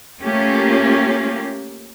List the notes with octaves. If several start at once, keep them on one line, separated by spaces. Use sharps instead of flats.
A3 A#3 C#4 F4 G4